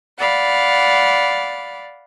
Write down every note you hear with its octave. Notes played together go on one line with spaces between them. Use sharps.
D5 F5 F#5 B5